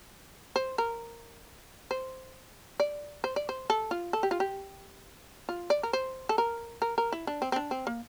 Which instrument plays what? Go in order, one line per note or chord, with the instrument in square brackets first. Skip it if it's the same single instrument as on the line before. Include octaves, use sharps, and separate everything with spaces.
[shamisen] C5
A#4
C5
D5
C5
D5
C5
A4
F4
A4
G4
F4
G4
F4
D5
A#4
C5
A4
A#4
A#4
A#4
E4
D4
C4
C4
D4
C4
A#3